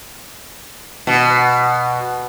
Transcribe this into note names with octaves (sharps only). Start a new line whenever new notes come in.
B2